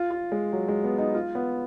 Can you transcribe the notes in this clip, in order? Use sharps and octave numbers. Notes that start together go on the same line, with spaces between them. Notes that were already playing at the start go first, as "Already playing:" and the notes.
Already playing: F4
F4
G#3
F#3
G#3
B3
D#4
F4
B3